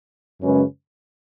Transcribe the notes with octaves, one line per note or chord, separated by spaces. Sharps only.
F#2 C#3 G#3 C#4 B4